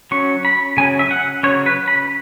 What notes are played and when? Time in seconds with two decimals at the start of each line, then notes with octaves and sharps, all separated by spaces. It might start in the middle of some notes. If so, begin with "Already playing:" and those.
0.11 F#3 C#4 C#6
0.45 B5
0.77 C#3 F#3 C#4 G#5
0.99 E5
1.11 F#5
1.43 C#3 F#3 C#4 C#5
1.66 B4
1.88 B5